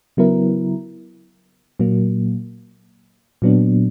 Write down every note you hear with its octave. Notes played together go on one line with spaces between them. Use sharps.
C#3 F#3 B3 E4 A#4
A#2 F#3 A#3
A#2 F#3 B3 D4